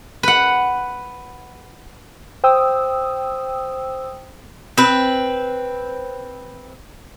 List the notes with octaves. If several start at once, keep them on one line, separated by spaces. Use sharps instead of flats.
B4 F#5
C5 G5 D#6 E6
C4 B4